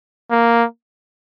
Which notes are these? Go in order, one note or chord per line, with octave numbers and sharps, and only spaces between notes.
A#3